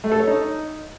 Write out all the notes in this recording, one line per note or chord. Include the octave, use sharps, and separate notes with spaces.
A3
A4
C#5
D#4